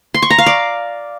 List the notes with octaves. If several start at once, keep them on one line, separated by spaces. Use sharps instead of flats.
C6
C#6
A#5
F5
D5